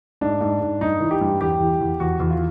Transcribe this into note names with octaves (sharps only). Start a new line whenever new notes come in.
G#2 D4
G#2
G#2
G2 D#4
E3
G4
G2
E2 G4
E3
E2
E2 F#4
E2
F4